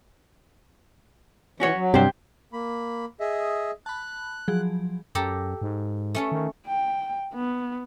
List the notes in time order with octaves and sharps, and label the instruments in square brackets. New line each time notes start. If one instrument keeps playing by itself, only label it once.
[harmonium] E3 [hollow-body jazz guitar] C#4 F#4 C#5
[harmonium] F#3
[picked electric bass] G2 C3 [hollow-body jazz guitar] G4 C5
[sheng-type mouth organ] A#3 B5
G#4 D#5 E5
[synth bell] A5 B5 [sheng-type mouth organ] F#6
[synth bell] F3 F#3 G#4
[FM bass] F#2 [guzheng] G4 A4 A#5
[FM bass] G#2
[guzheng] A3 C#4 A4
[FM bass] D#3
[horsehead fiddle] G5
B3